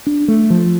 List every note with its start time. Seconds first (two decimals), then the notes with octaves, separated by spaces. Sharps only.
0.07 D4
0.28 A3
0.50 F3